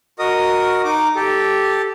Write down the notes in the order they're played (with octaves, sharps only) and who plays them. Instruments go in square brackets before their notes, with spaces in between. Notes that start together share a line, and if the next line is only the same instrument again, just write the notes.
[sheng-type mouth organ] F#4 A#4 D#5 D#6
D#4 D6
G4 A4